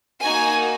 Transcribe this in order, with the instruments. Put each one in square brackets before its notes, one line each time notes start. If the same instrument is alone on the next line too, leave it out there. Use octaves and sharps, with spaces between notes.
[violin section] A#3 D#4 F#4 G#5